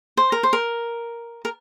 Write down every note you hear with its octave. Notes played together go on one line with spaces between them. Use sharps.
C5
A#4
C5
A#4
A#4